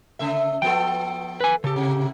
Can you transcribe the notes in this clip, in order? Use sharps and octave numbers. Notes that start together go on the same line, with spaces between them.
C#3 A3 E5
F3 B3 A4 G5
B4 G#5
C#3 G4 A4
A2 C3